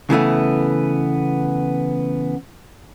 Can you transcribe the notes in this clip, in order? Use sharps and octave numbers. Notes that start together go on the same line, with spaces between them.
C#3 E3 A3 B3